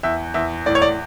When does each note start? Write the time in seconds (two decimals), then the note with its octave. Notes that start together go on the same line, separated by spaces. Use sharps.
0.03 E2 E5
0.34 E2 E5
0.66 A2 D5
0.75 C#5
0.82 D5